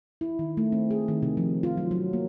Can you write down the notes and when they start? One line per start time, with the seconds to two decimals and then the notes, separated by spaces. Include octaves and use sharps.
0.21 E4
0.39 D#3
0.57 A3
0.72 C4
0.91 G#4
1.08 D#3
1.22 C3
1.37 F3
1.63 F4
1.77 F#3
1.91 F#3
2.13 A#3